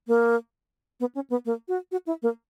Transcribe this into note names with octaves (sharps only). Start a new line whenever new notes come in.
A#3
B3
C#4
B3
A#3
F#4
F#4
E4
A#3